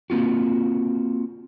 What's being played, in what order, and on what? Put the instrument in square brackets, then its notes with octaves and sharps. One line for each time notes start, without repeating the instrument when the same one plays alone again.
[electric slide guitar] A#3 C4 F4 F#4